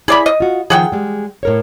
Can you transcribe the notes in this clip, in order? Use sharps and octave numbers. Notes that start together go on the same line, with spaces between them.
E4 G#4 D5 B5
D#5
F4 F#4
D#3 F3 G#4 F#5 G5
G3 G#3
A2 A#4 C#5